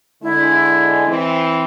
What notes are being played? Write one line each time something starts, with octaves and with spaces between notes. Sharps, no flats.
D3 G#3 E4
E3 C4